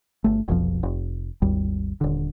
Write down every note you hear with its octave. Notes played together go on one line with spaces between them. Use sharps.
G1 A3
F1 B1 F2 F3
F1
G#1 D#2 G3
D#1 D3